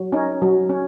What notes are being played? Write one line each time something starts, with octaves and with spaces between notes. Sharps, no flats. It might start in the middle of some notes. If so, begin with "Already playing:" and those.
Already playing: F#3
C#4 D#4
F#3
C#4